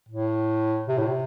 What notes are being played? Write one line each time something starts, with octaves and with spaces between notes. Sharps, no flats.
A2
C3
A2
C3